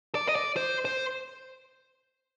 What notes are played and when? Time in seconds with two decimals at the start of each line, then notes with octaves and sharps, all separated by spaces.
0.15 D5
0.29 D#5
0.35 D5
0.56 C5
0.85 C5